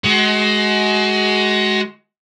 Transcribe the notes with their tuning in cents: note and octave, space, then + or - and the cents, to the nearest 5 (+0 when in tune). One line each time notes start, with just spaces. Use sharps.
G#3 +25 F#4 +25